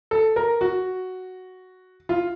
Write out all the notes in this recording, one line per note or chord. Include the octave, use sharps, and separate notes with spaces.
A4
A#4
F#4
F4